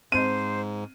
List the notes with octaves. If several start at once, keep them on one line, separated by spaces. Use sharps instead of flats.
G#2 C4 C5 D#5 D#7